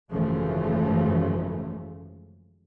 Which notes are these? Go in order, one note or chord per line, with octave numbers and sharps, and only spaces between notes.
G#1 F#2 C#3 E3 F3 A3